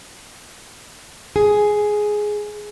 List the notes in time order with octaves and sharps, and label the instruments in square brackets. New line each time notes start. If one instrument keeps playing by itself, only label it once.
[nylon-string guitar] G#4